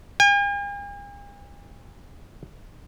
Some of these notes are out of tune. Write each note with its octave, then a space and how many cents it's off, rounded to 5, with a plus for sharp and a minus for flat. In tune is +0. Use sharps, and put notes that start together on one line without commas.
G#5 -45